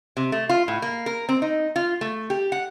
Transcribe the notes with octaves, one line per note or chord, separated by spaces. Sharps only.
C3
A3
F4
A2
A#3
A#4
C4
D#4
F4
A3
G4
F#5